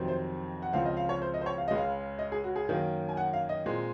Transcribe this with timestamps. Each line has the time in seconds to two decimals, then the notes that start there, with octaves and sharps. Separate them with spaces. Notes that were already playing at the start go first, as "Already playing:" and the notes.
Already playing: F2 C3 D#3 F#3 C4
0.08 C5
0.62 F#5
0.73 C#2 C#3 F3 C4 F5
0.85 D#5
0.97 F5
1.09 C#5
1.22 C5
1.34 D#5
1.41 C5
1.46 C#5
1.58 F5
1.68 C#2 C#3 G#3 C#4 D#5
1.77 F5
2.19 D#5
2.32 G#4
2.44 F#4
2.56 G#4
2.69 F#2 D#3 F#3 A#3 C#4
3.09 G#5
3.17 F#5
3.33 F5
3.49 D#5
3.66 A#2 G#3 C4